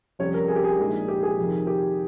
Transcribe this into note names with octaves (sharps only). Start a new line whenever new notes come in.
F2 C3 G3 C#4 C#5
A#4
G#4
G4
G#4
A#1 A#2 F3 G#3 D#4
G4
G#4
F2 C3 D#3
G4